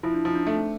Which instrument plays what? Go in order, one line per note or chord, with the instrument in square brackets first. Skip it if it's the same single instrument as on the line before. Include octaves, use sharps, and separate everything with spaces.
[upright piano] F3 [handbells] E4
[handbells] D4
[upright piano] F3 [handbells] D#4
[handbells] D4
[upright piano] A3 [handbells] D4
[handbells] C4